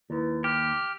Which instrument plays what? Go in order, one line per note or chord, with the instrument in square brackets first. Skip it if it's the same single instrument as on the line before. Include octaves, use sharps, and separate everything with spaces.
[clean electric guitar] D#2 [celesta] E4 B4
[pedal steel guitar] G4 [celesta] D6 F#6 [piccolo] F6